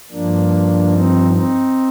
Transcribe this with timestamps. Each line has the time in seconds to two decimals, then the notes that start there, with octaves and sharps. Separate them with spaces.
0.11 G2 F3 A#3 D4
0.91 C4 D#4
1.30 C4 D#4